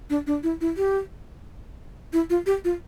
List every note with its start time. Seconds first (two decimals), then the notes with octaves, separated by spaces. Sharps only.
0.10 D4
0.27 D4
0.43 E4
0.61 E4
0.77 G4
2.13 E4
2.30 F4
2.46 G4
2.64 F4